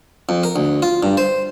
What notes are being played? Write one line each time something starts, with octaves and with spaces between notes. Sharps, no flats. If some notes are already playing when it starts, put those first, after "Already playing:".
F2
A#4
D2
F4
G2
C5